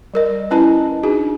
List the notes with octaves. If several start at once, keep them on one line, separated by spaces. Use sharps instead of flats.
G3 A#4 D#5
C#4 E4 B4 D#5 A5 A#5
D4 D#4 F#4 G#4